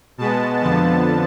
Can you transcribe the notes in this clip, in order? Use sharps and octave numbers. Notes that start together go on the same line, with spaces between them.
B2 G#3 B3 A5
F2 D3 F3 B3 A5